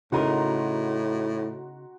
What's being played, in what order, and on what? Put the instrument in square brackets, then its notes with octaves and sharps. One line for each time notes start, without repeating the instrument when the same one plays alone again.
[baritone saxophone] A2 [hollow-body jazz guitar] C#3 D#4 A#4 [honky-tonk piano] F#4 A#5 C6